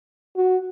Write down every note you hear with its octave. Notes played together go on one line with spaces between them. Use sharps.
F#4